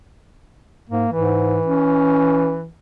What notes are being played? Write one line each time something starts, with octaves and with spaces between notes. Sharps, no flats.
G#2 A#3
G#2 E3
C#4